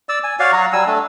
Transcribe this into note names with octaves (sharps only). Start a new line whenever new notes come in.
D5 E6
G#5
F#4 C#5 D5 F5
F#3 F#4 A#5
F#3 G3 G#5 E6
A3 D4